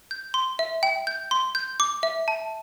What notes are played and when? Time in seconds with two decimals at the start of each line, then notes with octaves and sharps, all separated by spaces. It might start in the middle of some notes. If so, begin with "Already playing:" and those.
0.11 G6
0.34 C6
0.59 E5
0.83 G5
1.07 G6
1.31 C6
1.55 G6
1.80 D6
2.03 E5
2.28 A5